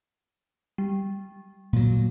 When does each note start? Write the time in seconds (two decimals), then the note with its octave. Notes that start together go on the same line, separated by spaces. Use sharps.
0.78 G3
1.73 A#2 F#3